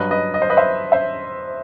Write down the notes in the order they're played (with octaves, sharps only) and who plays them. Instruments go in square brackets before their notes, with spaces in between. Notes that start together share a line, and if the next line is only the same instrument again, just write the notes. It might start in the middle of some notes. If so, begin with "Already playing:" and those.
Already playing: [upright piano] G2 F#3 B4 D#5
B4 D#5
D#5
C5
B4 D#5
C5 E5
C5 E5